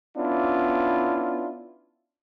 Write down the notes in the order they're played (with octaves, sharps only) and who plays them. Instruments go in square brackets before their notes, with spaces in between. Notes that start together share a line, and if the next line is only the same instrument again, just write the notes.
[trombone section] B3 C#4 D4 E4 F4